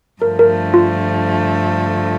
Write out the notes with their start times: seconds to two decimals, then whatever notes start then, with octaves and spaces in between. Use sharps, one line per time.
0.22 G2 D3 F3 A3 A#4
0.39 A#4
0.74 F4